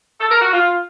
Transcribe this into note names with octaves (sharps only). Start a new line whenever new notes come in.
A4
A#4
F#4
F4